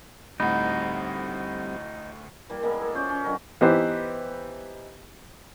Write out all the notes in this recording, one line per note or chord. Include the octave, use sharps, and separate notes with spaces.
D2 A2 G3 C4 D#4 F#5 B5
E3 G3 A#3
G#3 A#3 B3 E4
A4
F3 C#4 C5 D5
C#4
D3 D#3 F#3 A#4
E3 B3 D#4 G4 B4 C5